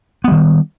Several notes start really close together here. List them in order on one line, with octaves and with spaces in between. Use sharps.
B3 G3 D#3